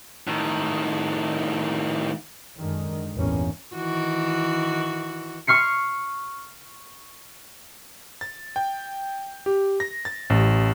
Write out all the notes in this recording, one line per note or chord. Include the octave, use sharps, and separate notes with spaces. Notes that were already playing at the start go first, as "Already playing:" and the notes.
A2 D#3
F#2 D3 D#3 G#3
A1 E2 G2 A#3 C#4
D#3 E3 F#4
C#6 F6 C7 C#7
A6
G5
G4
A#6
A6
A1